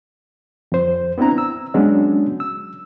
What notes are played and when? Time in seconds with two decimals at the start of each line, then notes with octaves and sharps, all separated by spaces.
0.72 F2 C5
1.18 B3 C4 D4 E4 A#5
1.38 E6
1.74 F#3 G#3 B3 C#4 D4 F#4
2.40 E6